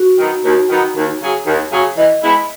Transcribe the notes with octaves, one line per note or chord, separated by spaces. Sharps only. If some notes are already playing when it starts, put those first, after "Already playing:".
Already playing: F#4
D#3 F#3 B3 D#4
D#2 F#4
D#3 F#3 B3 D#4
D#2
C#3 F#3 C#4 G#4
D#2
C#3 F#3 C#4 G#4
E3 D#5
G#3 B3 E4